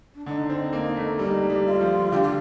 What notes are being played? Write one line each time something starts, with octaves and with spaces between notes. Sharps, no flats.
D4
D3 D#4
C4
A#3
A3
G3 D#4
G3
F4
F3
D3 G4
F4